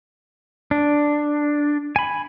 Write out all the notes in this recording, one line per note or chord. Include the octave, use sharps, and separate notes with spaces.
D4
G#5 B5